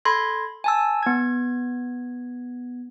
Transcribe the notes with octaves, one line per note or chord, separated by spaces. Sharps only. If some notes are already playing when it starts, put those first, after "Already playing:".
A4 B5 C6 G#6 A#6
G#5 A5 E6
B3 G#6